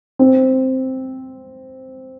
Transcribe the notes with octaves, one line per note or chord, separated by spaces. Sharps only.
C4